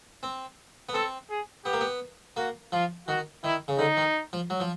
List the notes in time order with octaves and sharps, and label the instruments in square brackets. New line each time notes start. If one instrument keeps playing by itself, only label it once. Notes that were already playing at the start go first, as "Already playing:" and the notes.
[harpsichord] C4
B3
[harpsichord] C4 [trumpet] A4
[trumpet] G#4
[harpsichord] B3 [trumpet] G4
[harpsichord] A#3
B3
[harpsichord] A#3 [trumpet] F#4
[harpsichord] F3 [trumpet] F4
[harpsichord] D#3 [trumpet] F#4
[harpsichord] D#3 [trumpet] E4
[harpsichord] C#3
[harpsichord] D3 [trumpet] D#4
[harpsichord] D#3
F3
F#3
F3